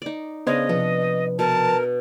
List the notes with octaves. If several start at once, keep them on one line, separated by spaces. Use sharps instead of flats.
D#4 D5
C#3 B3 D4 C5 D#5 F5 G#6
C3 F3 B3
B2 A#4 A5